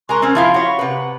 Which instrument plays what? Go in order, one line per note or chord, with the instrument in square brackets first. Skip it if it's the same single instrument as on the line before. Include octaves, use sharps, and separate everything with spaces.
[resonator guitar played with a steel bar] G#3 A#4 A#5 [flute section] C6 C#6 F#6
[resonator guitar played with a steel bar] C4 C#4 [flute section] F6
[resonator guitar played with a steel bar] F3 E4 F4 [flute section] F5 B5 C6
[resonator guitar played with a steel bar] F#4 C#5
[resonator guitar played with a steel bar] C3 B4 [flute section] F#5